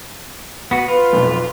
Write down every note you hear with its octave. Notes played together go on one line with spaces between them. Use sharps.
B3 F#4
F4 B4
B1 F2